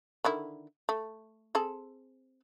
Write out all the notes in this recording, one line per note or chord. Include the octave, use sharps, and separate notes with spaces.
D3 D#3 E4
A3
C4 G#4 A4